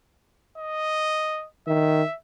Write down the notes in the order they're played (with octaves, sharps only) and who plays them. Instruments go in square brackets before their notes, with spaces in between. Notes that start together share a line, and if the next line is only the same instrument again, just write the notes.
[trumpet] D#5
[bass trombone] D#3 [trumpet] E5